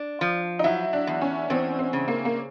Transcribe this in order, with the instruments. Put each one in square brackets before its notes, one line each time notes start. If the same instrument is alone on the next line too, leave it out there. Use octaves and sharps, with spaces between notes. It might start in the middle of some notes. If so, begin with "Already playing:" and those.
Already playing: [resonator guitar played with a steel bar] D4
F3
[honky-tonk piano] D#4
[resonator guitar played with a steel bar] F#3 [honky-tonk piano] E4
[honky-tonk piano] D4
[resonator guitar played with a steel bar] E2
[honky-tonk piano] C#4
[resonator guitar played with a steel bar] E2 [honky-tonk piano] C4
[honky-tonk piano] C4
[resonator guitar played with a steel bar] C#3
[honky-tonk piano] A#3
A#3